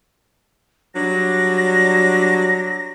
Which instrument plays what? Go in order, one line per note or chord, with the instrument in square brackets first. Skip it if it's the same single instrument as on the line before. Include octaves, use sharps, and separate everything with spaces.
[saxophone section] F#3 G3 D4 [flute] A#6